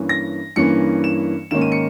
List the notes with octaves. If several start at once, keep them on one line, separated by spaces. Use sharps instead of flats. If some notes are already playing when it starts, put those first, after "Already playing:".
Already playing: G2 E3 A#3 C#4
A#6
G2 E3 A#3 C#4 C#7
E7
G#2 D#3 A#3 C#4 E7
D#7
C#7